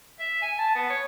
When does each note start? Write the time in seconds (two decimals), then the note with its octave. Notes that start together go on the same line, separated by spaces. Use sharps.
0.20 E5
0.42 G#5
0.59 A5
0.75 B3
0.90 C#5